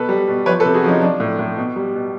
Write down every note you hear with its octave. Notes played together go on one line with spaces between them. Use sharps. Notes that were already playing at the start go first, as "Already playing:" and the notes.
Already playing: B2 A4 B4
G3
B2
F3 B4 C#5
A4 B4
C3
F#4 G#4
F3 C#4 D#4
F3 D4
A2
A2
B2
G3
B2